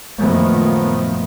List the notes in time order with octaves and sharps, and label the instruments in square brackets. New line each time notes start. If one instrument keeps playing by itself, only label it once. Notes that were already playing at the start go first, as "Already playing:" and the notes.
[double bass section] F#2 A#2 D#3 F3 A3 B3